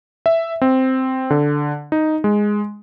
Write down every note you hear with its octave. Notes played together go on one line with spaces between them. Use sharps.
E5
C4
D3
D#4
G#3